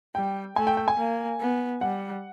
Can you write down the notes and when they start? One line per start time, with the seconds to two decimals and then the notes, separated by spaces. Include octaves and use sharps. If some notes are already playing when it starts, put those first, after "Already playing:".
0.15 G3 G5
0.56 A3 G#5
0.67 G5
0.77 G5
0.88 G#5
0.98 A#3
1.40 B3
1.81 G3 F#5